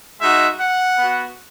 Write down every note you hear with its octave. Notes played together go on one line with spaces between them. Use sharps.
G#3 D#4 F#4 E5
F#5
B3 F#4